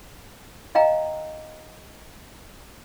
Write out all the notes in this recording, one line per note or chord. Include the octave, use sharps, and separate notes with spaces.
D#5 F5 G5 A#5